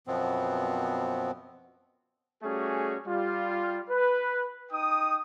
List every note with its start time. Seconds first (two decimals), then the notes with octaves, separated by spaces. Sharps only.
0.07 F#2 B2 F3 B3 C4
2.43 G3 A3 C#4 F#4 G#4
3.07 G3 F4
3.90 B4
4.72 D#4 G5 D#6